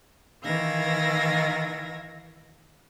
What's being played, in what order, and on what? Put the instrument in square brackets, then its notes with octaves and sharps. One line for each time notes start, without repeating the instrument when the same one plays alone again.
[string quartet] D#3 E3 F5 E6 G#6 A#6